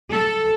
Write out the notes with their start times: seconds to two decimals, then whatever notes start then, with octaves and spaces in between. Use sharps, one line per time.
0.11 A4